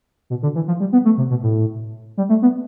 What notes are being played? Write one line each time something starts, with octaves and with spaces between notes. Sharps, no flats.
B2
D3
E3
F3
G3
B3
A3
C3
B2
A2
G3
A3
B3